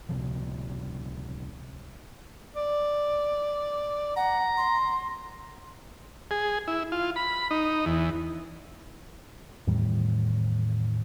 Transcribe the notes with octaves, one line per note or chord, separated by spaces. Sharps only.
C#2 C3 F3
D5
F#5 A#5
C6
G#4
E4
F4
B5
D#4
E2
E2 A2 D#3 G3